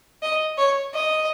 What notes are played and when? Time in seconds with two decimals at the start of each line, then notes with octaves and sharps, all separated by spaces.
0.22 D#5
0.58 C#5
0.94 D#5